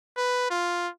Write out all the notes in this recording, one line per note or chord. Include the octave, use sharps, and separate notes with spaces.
B4
F4